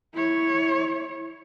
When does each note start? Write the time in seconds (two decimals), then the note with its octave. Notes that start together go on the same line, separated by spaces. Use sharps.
0.13 E4 C#5